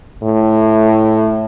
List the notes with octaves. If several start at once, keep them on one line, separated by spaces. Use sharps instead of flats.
A2